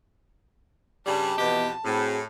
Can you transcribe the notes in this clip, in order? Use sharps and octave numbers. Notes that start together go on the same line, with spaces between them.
G2 C#3 G3 A5
F2 B2 E3 B3 G4 D#5
A2 C4 F#4 G#4